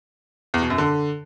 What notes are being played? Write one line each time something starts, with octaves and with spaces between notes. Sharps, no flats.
E2
B2
F#2
D3